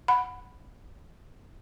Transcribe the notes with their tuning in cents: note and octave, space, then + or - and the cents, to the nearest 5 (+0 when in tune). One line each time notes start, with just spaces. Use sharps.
F#5 -5 B5 +0